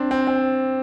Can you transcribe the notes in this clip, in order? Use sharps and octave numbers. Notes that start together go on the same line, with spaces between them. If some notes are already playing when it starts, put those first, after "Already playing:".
Already playing: C4 D4
C4
C4